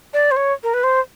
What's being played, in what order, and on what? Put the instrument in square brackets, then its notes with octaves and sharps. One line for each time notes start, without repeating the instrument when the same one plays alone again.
[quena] D5
C5
C#5
A#4
B4
C5